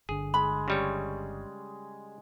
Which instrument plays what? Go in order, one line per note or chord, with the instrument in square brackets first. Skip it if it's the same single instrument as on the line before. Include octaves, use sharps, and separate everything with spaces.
[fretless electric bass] G1 D3 [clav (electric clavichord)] G#4
[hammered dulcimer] G#3 [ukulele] B5
[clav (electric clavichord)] C#3 G3 C#5